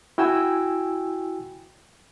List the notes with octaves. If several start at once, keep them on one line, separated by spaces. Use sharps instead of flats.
E4 F#4 G5 G#5 E6